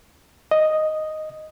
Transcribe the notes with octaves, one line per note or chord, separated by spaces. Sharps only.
D#5